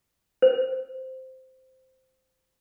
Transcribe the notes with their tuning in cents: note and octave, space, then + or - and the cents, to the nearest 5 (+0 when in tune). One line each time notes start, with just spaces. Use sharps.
C5 -10